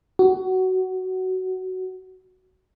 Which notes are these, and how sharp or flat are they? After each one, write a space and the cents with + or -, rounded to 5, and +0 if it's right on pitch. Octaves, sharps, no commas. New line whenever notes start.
F#4 +15